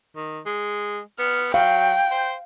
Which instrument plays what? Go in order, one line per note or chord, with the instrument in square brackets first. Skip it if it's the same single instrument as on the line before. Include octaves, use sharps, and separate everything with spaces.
[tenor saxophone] D#3
G#3
[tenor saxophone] B3 [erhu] F6
[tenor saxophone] F#3 [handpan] F5 [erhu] G5
[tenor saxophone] C5